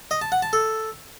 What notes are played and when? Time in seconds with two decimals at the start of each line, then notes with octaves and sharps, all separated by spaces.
0.11 D#5
0.21 A5
0.32 F#5
0.42 A5
0.53 A4